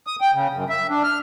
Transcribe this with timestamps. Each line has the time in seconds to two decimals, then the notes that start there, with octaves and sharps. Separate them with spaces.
0.07 D#6
0.21 G5
0.34 C#3
0.54 F#2
0.69 E5
0.90 D4
1.03 F6